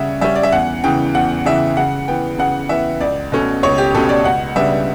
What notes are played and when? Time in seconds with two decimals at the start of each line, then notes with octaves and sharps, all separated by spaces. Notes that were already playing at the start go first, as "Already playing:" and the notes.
Already playing: C#3 G3 C#4 E5 F#5
0.21 G3 C#4 E5
0.35 D5
0.43 E5
0.52 E2 F#5
0.84 C#3 E3 G5
1.15 E2 F#5
1.46 C#3 E3 E5
1.77 C#3 F#5
2.08 E3 B3 G5
2.38 C#3 F#5
2.69 E3 B3 E5
3.00 C#2 D5
3.32 B2 A3 C#4
3.63 C#2 C#5
3.78 G4
3.95 B2 A3 C#4 A4
4.09 D5
4.24 C#2 F#5
4.56 C#3 G3 B3 D4 E5